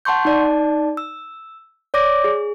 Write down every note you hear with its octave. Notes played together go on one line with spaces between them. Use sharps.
F#5 A5 C6 C#6 G6
D#4 D5 A5
E6
C#5 D5 D6 A#6
G#4